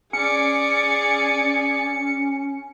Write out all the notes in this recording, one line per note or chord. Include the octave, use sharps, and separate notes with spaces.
C#4 G#4 D5 C#7